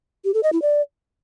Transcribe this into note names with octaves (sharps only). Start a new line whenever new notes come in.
G4
A4
D#5
E4
D5